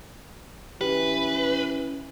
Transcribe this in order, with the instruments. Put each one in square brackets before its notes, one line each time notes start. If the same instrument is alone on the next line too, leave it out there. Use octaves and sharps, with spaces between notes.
[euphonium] E3 [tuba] C#4 [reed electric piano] G4 [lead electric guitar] B4